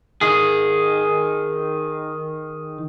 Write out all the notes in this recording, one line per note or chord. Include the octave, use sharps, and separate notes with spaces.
D#3 G#4